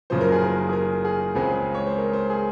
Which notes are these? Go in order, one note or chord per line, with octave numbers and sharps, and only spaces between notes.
F#1 F#2 C#3 F3 C5
A#4
G#4
A#4
G#4
A#4
G#4
C#2 C#3 G#3 C4 G#4
C#5
C5
A#4
C5
G#4